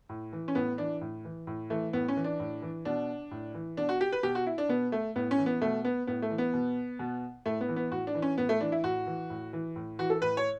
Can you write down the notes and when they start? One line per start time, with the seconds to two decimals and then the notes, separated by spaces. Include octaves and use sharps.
0.09 A2
0.33 E3
0.48 C#4
0.55 A2 B3
0.78 E3 D4
1.01 A2
1.25 E3
1.47 A2
1.70 E3 A3
1.93 A2 B3
2.08 C#4
2.16 E3
2.24 D4
2.40 A2
2.62 E3
2.85 B2 D4
3.31 A2
3.54 E3
3.77 B2 D4
3.89 F#4
4.01 G4
4.12 B4
4.23 B2 G4
4.35 F#4
4.47 E4
4.58 D4
4.69 B2 B3
4.92 A3
5.15 A2 B3
5.31 C#4
5.38 E3
5.46 B3
5.61 B2 A3
5.85 B3
6.07 A2 B3
6.22 A3
6.30 E3
6.38 B3
6.54 B2
6.99 B2
7.46 A2 A3
7.61 B3
7.69 E3
7.76 B3
7.91 A2 F#4
8.07 D4
8.15 E3
8.22 C#4
8.38 A2 B3
8.49 A3
8.61 E3 D4
8.72 E4
8.84 A2 F#4
9.07 E3
9.30 A2
9.53 E3
9.76 A2
9.99 E3 F#4
10.10 A4
10.22 A2 B4
10.37 C#5